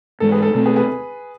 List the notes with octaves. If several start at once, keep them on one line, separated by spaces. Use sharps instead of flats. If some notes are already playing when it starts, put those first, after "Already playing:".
G#2 E3 G#3 A4
G#4 B4
A4
B2 A3 C4 A4
G#4 B4
G#4 B4